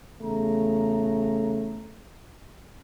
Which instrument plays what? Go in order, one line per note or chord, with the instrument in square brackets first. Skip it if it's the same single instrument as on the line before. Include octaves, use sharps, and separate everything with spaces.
[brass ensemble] E2 C#3 A3 A#5